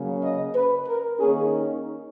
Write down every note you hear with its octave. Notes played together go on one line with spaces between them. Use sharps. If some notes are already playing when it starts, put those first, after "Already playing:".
Already playing: C#3 F#3 A#3 C#4
D#5
B4
A#4
D#3 A#3 C#4 G#4
D#4